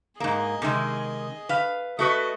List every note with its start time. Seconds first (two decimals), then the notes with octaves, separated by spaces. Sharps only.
0.20 G#2 A#3 G#4 D#5
0.62 C3 D#3 G#3
1.49 B4 F5
1.99 A3 F#4 B4 D#5